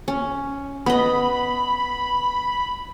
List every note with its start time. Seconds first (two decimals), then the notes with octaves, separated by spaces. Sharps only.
0.08 C#4
0.86 B3 D#5 B5